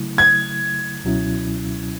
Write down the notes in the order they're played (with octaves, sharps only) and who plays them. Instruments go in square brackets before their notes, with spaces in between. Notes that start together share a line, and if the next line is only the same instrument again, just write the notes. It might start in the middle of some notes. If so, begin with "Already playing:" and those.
Already playing: [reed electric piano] C#3 F#3 A3 E4
[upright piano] G#6
[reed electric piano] C#2 B2 F#3 C#4 E4